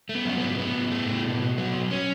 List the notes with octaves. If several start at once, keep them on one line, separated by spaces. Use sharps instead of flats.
A3
B3
F#3 C#4
G#2 B3
A2 B3
A2
A3
A2
B2
B2
F#3
B2
C#4